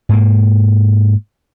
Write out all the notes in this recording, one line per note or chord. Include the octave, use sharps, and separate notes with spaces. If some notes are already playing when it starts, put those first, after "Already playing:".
G#2 A#3